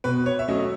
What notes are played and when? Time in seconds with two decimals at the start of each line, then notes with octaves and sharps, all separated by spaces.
0.04 B2 B4
0.26 C#5
0.39 E5
0.48 F#3 A3 C#4 D#5